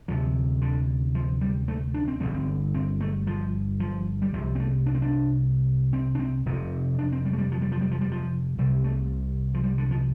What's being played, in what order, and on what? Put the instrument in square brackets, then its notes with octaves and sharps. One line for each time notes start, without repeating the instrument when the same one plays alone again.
[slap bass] D2 C3 F3
D3
F3
G3
A3
D4
C4
G1 F2 D3 A3
C4
C4
A3
F3
F3
G3
C2 C3 F3
C4
A3
D4
C4
D4
C4
D4
C4
F1 F2 C3
D4
C4
G3
A3
G3
F3
G3
F3
G3
F3
G3
F3
C2 C3 G3
A3
F3
G3
D3
F3